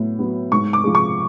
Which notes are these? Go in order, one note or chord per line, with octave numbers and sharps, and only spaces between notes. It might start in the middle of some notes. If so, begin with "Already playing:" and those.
Already playing: A2 F#3 B3
F#3 B3
G#2 C#6
D6
F3 G#3
C#6